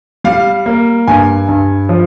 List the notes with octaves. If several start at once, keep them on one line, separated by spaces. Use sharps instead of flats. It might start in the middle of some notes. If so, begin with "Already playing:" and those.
G3 F5
A#3
G2 G#5
G2
F3